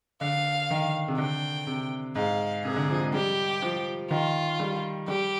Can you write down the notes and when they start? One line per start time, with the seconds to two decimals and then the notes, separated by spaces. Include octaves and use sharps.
0.21 D3 F5
0.71 D#3
1.08 C3
1.18 D3 G5
1.67 C3
2.15 G#2 F5
2.64 C3 G#4
2.76 D3
2.89 F3
3.01 G#3
3.14 G3 G4
3.62 F3
4.11 D#3 F4
4.60 G3
5.08 G3 G4